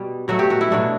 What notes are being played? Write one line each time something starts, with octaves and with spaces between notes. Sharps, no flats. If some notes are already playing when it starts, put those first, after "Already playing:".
Already playing: B2 G3
B2 F#3 A3 F#4
G4
F#4
E4
B2 F#3 A3 D4